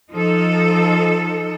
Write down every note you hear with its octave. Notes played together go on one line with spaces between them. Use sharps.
F3 D#4 A4